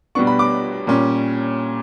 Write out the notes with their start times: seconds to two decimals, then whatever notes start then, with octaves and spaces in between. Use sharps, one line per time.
0.15 B2 G3 B3 D4 C#6
0.27 B5
0.39 D6
0.87 A#2 G3 C#4